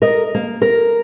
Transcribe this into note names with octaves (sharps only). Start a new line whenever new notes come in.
A#4 D#5
A#3
A#4